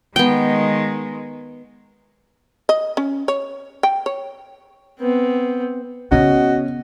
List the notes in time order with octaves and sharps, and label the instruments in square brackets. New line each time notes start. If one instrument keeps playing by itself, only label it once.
[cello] D#3 G#3 [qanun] B3 G5
[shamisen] D#5
C#4
C#5
G5
C#5
[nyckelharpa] B3 C4
[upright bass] C#3 B3 [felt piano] C#4 [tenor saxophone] F#4 [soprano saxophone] D#5